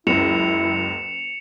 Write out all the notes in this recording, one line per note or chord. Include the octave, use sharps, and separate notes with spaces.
F#1 C#2 E4 C#7 E7 F7